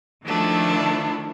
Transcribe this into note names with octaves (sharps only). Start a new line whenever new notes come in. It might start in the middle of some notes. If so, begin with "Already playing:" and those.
D#3 F3 A3 D4 E4